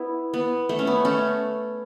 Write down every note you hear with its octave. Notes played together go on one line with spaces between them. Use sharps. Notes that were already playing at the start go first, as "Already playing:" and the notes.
Already playing: B3 E4
B3
A3
C#4
B3
A3 C#4